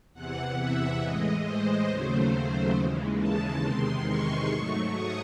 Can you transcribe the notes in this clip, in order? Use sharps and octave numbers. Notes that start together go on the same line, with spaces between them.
E2 C3 E3 F#5
E5
A2 E3 G#3 D#5
C5
D#2 C#3 F#3 A3 C5
D#2 C#3 E3 G#3
A5
E2 C3 D#3 G#3 C6
C#6
G#2 F#3 A3
D#6